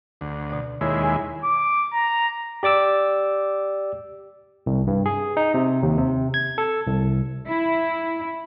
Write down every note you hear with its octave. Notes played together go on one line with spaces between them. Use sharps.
D2
B2 D5
D#2 G#3 E4 C#5
G#5
D6
A#5
G4 D5 D6 E6
C2
G2
G#4
D#4
C3
D#2
C3
G#6
A4
C2
E4